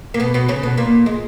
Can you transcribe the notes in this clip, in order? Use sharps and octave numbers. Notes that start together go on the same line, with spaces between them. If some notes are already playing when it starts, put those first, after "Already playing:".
A#3
B2 B3
B2 B3
C#3 C#4
B2 B3
A#2 A#3
G#3